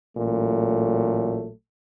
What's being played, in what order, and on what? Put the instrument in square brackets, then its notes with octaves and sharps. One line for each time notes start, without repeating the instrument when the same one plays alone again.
[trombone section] A1 A#2 F#3 A3